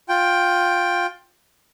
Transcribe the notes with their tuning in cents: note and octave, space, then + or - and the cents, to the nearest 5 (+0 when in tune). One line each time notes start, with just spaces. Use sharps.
F4 +15 G5 +0